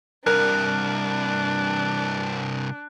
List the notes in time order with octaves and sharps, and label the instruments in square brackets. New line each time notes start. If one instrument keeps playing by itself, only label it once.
[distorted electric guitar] C2 G2 [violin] D4 [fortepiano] A#4 [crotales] F#6